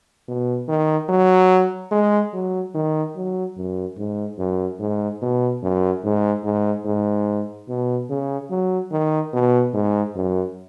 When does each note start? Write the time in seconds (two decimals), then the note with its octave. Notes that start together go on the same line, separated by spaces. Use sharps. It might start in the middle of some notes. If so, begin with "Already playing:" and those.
0.28 B2
0.69 D#3
1.09 F#3
1.92 G#3
2.34 F#3
2.75 D#3
3.16 F#3
3.57 F#2
3.98 G#2
4.39 F#2
4.80 G#2
5.22 B2
5.63 F#2
6.04 G#2
6.44 G#2
6.86 G#2
7.69 B2
8.10 C#3
8.50 F#3
8.92 D#3
9.33 B2
9.74 G#2
10.16 F#2